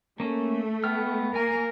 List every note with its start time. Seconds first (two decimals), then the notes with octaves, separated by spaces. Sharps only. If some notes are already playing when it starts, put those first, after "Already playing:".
0.20 A3 A#3 C#4
0.84 B3 G5 F6
1.36 A#3 A#4 G#5